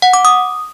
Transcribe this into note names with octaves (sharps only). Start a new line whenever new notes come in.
F#5
D6
D#6